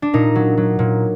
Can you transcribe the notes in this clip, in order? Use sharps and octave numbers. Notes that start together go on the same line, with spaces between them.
D4
A#2 D#4
F#3
F#3
A#2